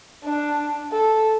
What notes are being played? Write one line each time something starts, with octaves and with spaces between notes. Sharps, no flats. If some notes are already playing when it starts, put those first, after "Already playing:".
D4
A4